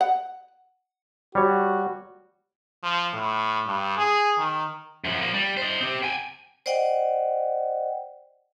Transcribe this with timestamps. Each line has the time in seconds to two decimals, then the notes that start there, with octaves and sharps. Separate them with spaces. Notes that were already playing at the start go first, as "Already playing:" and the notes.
0.01 F#5
1.35 G3 F#4 C#5
2.83 F3
3.14 A2
3.67 G2
3.97 G#4
4.38 D#3
5.05 F#2 F3
5.21 F3 A#3
5.34 G3
5.57 C5 D#5
5.80 C4 G4
6.03 G5 G#5
6.66 C5 D5 D#5 F#5 G5